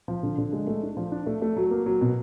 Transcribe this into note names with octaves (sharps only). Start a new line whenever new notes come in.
F3
D3
D3
G#3
A3
D4
F3
D4
A3
A3
F#3
A#3
F#3
B2